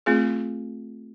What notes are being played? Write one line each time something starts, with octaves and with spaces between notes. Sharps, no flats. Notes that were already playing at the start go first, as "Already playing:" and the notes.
A3 C4 F4 G#4